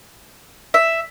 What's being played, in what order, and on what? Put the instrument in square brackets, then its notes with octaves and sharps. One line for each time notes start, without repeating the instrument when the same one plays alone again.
[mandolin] E5